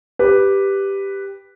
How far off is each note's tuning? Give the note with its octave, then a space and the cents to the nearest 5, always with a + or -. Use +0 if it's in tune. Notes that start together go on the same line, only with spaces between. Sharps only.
G4 +5 B4 +0